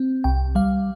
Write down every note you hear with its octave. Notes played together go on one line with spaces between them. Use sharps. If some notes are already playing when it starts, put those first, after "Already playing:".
Already playing: C4
C2 G5
G3 F5